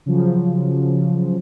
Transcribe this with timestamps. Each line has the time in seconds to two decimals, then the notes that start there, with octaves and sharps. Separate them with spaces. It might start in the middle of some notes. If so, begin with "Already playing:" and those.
0.06 C#3 F3 F#3